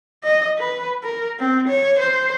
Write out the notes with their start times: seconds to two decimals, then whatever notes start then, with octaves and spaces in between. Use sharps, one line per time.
0.24 D#5
0.58 B4
1.03 A#4
1.39 C4
1.68 C#5
2.00 C5